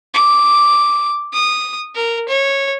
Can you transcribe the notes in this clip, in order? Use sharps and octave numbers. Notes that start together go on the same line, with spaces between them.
D6
D#6
A#4
C#5